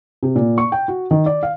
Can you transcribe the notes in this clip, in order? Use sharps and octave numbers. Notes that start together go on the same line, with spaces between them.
C3
A#2
C#6
G5
F#4
D#3
D5
F5